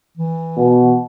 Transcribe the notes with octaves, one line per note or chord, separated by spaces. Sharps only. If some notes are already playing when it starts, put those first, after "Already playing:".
E3
B2